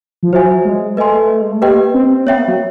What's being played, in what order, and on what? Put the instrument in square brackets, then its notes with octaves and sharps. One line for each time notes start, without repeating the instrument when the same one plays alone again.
[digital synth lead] F3
[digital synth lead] F#3 [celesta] C5 E5 G#5
[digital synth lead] G#3
[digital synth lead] A3 [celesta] B4 D#5 G#5 C6
[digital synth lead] G#3
A3
[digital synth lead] A#3 [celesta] G4 B4 D#5 G5
[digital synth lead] C4
[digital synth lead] B3 [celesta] C#5 E5 G5
[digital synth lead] A#3
F#3